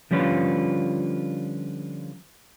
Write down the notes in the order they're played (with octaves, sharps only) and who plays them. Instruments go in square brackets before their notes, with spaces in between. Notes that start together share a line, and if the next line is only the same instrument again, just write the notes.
[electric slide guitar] D3 F3 G3 C#4 F4 B4